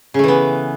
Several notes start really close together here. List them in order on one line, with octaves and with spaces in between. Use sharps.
C#3 A3 E3 B3